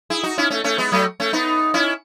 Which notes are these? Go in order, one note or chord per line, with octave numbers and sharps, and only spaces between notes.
E4 G#4
D#4 F#4
C#4 E4
A3 C#4
A3 C#4
G#3 B3
F#3 A3
A3 C#4
B3 D#4
C#4 E4